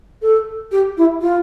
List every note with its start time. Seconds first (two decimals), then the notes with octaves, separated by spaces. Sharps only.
0.22 A4
0.72 G4
0.97 E4
1.21 F4